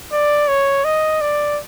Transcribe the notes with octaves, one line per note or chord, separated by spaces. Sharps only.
D5
C#5
D#5
D5